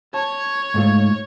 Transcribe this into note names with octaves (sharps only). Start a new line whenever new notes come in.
C#5 A5
G#2 A3 F4